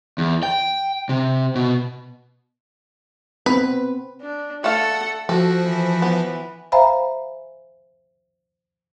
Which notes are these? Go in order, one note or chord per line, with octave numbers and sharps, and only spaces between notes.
E2
G5
C3
B2
B3 C4 B4
D4
A3 A4 F5 F#5
F3 F#4 A4
E3
B3
C5 E5 F5 G#5 A#5 B5